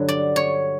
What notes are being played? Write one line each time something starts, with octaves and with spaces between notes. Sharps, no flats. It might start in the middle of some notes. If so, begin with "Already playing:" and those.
Already playing: G2 D3 F#3
D5
C#5